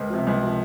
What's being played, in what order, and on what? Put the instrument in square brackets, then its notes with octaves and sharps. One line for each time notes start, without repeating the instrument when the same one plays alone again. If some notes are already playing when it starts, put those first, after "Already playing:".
Already playing: [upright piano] C#2 A#4 C5
C3 F3
C#2
C3 F3